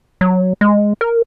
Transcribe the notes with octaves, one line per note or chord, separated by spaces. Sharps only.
F#3
G#3
A#4